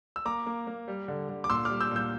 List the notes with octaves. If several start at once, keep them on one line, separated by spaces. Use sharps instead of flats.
E6
A#3 A#5 D6
A#3
A#3
G3
D3
D3
D6
A#2 C6 E6
G3 D6 F6
E6 G6
A#2 E6 G6